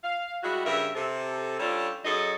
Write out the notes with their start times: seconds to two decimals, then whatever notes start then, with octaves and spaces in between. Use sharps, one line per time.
0.04 F5
0.43 G3 G#3 E4 F#4
0.66 G2 C#3 A#4 E5
0.95 C3 A4
1.60 G3 C#4 D4 F4 A4 C#5
2.05 F#2 G#4 A4 C#5 D#5